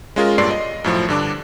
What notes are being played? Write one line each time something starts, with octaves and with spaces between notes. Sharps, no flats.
G#3 C#4 F4 G#4 A#4
G2 A#2 D5 C6 C7
D#5
F#2 A2 F3
G2 D3 D4 D6